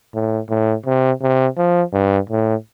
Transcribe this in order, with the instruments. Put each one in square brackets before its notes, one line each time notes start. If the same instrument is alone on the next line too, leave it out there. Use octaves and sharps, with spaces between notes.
[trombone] A2
A2
C3
C3
F3
G2
A2